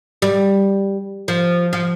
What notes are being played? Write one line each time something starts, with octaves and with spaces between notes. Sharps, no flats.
G3
F3
F3